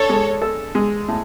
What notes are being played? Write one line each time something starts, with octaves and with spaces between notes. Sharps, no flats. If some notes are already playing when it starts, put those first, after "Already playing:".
Already playing: D4 A4 C#5
G#3
A4
G#3
A2